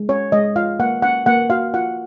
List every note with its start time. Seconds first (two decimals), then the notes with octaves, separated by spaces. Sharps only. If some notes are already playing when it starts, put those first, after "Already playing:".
Already playing: G#3
0.09 C#4 C#5
0.32 G#3 D#5
0.56 F4 F5
0.80 A#3 F#5
1.02 C#4 F#5
1.26 A#3 F#5
1.50 F#4 F5
1.74 F4 F#5